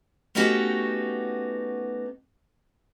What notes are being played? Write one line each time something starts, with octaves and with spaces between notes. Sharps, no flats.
A3 B3 C#4 D#4 F#4 G4